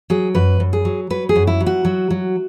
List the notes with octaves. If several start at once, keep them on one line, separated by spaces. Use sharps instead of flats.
F#3 G#4
F#2 B4
F#2
G#4
F#3
F#3 B4
G#4
F#2
E4
F#3
F#4
F#3
F#3